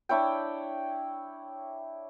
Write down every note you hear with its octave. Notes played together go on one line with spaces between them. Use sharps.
D4 E4 C#5 G5